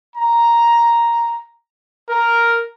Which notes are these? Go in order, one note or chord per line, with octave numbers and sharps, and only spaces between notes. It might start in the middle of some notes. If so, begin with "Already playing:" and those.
A#5
A#4